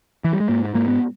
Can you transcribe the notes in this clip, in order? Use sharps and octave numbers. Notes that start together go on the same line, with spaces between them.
E3
G3
G#3
G#2 A#3
G#2 A#3
B3